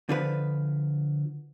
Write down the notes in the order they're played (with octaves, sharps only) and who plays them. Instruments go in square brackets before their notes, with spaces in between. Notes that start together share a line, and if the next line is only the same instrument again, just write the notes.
[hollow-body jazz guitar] D3 F3 B4